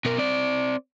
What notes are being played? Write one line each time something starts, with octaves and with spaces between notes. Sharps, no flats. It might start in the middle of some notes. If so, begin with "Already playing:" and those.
B2 A#4
C4 D5